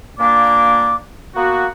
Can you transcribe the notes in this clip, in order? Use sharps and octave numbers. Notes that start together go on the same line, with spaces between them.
A#2 A#3 D4 D5 D6
A#3 B3 F#4